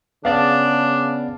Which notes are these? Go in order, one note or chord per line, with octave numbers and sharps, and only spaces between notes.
C#3 B3 D4 D5 F5 A5